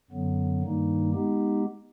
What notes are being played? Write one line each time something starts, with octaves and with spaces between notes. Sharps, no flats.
F#2 D3 F#3 B3
G2 D#3 G3 A#3 D#4
G#3 B3 D#4 G4